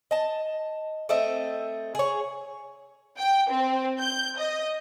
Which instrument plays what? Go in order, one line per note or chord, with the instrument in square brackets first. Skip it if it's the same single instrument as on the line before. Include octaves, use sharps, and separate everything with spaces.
[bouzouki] D#5 A5
A3 C4 D#5 E5
G#4 C#5
[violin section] G5
C4
G6
D#5